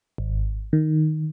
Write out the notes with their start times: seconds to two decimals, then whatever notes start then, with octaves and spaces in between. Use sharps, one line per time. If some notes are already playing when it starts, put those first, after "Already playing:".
0.18 G#1
0.73 D#3